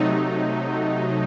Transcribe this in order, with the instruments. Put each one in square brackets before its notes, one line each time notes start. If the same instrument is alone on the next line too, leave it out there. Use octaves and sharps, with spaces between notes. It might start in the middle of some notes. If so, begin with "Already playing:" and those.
Already playing: [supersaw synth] C3 F#3 A3 D#4